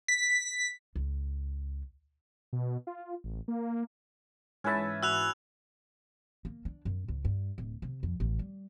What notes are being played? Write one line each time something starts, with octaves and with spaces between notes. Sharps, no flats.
B6
C#2
B2
F4
A1
A#3
G#2 E3 C#4 B4 E5 A5
F#4 B5 E6 F#6 F7
A#3
D4
F#2
C#2
G2
D1
C3
F2
A1
G3